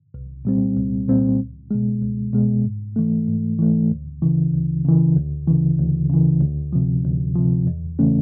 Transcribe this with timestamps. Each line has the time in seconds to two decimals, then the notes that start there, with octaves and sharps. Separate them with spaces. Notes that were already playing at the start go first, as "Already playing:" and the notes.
0.14 C2
0.45 A#2 G3 C4
0.76 C2
1.08 A#2 G3 C4
1.40 C#2
1.71 B2 G#3
2.02 C#2
2.33 B2 G#3
2.64 G#2
2.96 E3 A3
3.28 G#2
3.59 E3 A3
3.91 D2
4.22 C#3 E3
4.54 D2
4.85 C#3 E3
5.16 D2
5.48 C#3 E3
5.79 D2
6.10 C#3 E3
6.41 D2
6.73 C3 F3
7.04 D2
7.36 C3 F3
7.67 E2
7.99 C#3 E3 A3 C#4